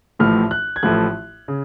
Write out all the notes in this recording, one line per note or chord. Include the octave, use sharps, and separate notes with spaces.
A1 A2 F3 A3 F6
F#6
G#6
A1 A2 F3 A3 F#6
C#3